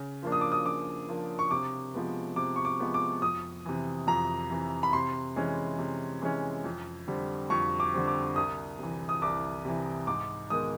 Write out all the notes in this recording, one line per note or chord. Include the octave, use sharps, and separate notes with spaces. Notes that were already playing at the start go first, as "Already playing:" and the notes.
Already playing: C#3
F3 A#3 D4
D#6
D6
D#6
C#3 D6
F3 A#3 D4
C#6
C3 D6
F3 G#3 B3
C3 D6
C#6
D6
F3 G#3 B3
D6
F2 D#6
C3 E3
F2 A#5
C3 E3
B5
C3 C6
E3 G#3 C#4
C3
E3 G#3 C#4
F2
D3 G3 C4
F2 C#6
D6
D3 G3 C4
D6
C2 D#6
C3 E3
D#6
C2 D6
C3 E3
G#2 D6
D#3 G#3 B3 D#6